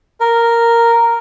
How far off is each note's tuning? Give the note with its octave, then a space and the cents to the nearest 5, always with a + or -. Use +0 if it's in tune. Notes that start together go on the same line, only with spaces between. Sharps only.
A#4 -5